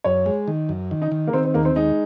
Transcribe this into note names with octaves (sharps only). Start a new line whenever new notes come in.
F#2 C#5
G#3
D#3
F#2
D#3
D#4
D#3
A#3
D#3 C4
C4
D#2 A#3
C4
G#3 D#4